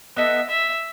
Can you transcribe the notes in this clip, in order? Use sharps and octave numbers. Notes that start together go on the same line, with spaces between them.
B3 D#4 A4 E5
E5